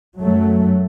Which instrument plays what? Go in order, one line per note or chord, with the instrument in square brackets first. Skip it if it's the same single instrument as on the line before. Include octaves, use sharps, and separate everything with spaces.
[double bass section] F#2 F#3 A3